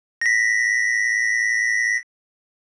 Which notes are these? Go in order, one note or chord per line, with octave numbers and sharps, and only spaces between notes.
A#6 B6